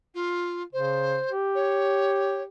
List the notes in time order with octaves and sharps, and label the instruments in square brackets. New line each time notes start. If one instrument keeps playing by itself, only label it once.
[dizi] F4
[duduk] C#3 [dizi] C5
[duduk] G4
[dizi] C#5